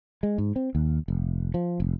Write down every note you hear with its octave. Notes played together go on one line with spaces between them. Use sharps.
G#3
G#2
C4
D#2
F1
F3
F1